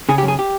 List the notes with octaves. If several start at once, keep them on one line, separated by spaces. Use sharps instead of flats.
C#3 G#4
G4
F#2
G#4
G4